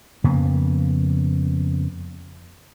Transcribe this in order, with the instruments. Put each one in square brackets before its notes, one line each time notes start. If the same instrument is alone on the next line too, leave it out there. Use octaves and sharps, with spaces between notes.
[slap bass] F2 C#3 A#3 B3